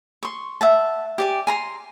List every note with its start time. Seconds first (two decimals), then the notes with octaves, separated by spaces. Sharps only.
0.23 C6 C#6
0.61 E5 F#5 A5
1.18 G4 D5 G#5
1.47 G#5 A#5 C6